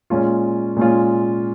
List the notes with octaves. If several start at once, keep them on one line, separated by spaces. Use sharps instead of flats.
A#2 G#3 C#4 F4
A#2 G#3 C#4 F4